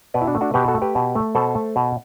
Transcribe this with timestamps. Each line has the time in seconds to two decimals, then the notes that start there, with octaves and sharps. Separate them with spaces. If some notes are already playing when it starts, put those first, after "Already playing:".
0.14 B2 B4 D5
0.21 E4
0.27 D4 F#4
0.35 A3
0.41 D4 F#4
0.54 B2 G4 B4
0.68 F#4 A4
0.75 A3
0.82 G4 B4
0.95 B2
1.15 A3
1.35 B2 A4 C5
1.55 A3
1.76 B2